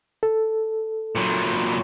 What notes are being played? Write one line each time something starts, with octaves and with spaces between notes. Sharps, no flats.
A4
A#2 F#3